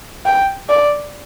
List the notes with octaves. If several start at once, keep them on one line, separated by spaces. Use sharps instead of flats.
G5
D5